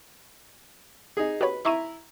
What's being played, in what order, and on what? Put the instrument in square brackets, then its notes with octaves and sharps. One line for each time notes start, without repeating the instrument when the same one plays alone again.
[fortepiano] D#4 G#4
[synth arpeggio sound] F#4 G4 C#5 [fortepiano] B4 B5
[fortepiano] E4 E5 A#5 [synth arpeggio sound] C6 C#6 D#7